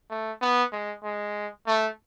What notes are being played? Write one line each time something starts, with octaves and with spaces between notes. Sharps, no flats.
A3
B3
G#3
G#3
A3